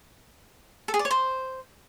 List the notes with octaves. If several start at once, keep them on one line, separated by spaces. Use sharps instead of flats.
A4
G#4
D5
C#5
C5